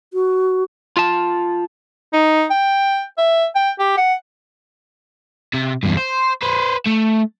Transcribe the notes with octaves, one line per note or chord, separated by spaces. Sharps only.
F#4
F4 A5
D#4
G5
E5
G5
G4
F#5
C3
E2 G2
C5
B4 C5
A3